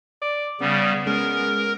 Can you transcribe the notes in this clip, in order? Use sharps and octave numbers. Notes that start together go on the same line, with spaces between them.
D5
C#3 G3 B3 C#4
G#3 C#4 G#4 A#4